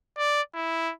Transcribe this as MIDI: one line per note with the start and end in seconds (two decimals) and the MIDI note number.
0.18 0.42 74
0.55 0.92 64